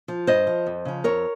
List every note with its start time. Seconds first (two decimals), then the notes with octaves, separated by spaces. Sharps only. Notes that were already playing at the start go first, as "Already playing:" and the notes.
0.08 F3
0.27 G2 C5 D#5
0.47 F3
0.66 F2
0.85 C#3 F3
1.04 F2 A#4 C#5